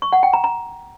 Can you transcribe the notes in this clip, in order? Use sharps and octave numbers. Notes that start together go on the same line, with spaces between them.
C#6
F#5
G5
A#5
A#5